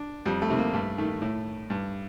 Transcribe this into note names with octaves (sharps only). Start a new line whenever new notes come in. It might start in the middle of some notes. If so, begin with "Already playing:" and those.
Already playing: D4
F2 G3
A3
C3 D#3
A#3
G2 A3
D#3 A3
A2
G2